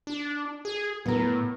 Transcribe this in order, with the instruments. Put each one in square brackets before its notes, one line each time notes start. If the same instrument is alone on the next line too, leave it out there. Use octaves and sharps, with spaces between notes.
[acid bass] D4
G#4
[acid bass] A2 [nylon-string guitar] B3 A#4